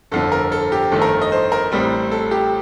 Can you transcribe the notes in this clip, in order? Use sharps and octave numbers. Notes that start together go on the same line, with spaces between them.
G1 F2 D3 A4
A#4
A4
G4
G1 F2 D#3 A3 A4
A#4
D#5
C5
A#4
A1 A2 G3 C4
A4
G4